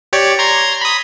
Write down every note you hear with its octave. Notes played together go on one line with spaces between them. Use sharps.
G4 C#5 D5
A#5 C6 G#6
B5 D#6